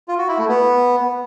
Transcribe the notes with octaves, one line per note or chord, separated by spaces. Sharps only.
F4
F#4
E4
A3
B3